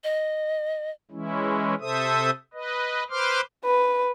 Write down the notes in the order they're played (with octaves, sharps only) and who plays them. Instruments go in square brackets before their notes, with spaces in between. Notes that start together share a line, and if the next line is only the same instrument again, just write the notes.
[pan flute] D#5
[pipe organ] E3 G#3 C#4 E4
C3 A4 C5 E5 D#6
B4 D#5
B4 C5 C6 D6 F6
[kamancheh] B4